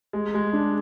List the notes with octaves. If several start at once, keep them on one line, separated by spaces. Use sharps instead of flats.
G#3
G#3
D4